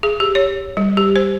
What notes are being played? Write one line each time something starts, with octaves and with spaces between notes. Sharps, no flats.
G#4
G4
C#5
G3
G4
C5